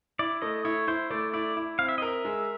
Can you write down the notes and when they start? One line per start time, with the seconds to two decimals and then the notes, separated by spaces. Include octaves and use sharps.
0.19 E4 D5
0.42 A3 D#5
0.65 E4 C#5
0.87 E4 C5
1.11 A3 D5
1.34 E4 D5
1.57 E4
1.79 C4 F5
1.88 E5
1.98 D#5
2.02 A#4
2.07 E5
2.25 G#3